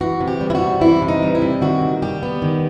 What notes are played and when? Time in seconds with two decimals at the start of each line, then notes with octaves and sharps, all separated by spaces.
0.01 E3 F#4
0.20 C3
0.28 G4
0.41 G3
0.50 E4
0.55 F#4
0.61 C3
0.81 E3 E4
1.02 C3
1.08 D#4
1.22 G3
1.35 E4
1.42 C3
1.61 D#3 F#4
1.82 D#2
2.02 G3 G4
2.23 B3
2.42 D#3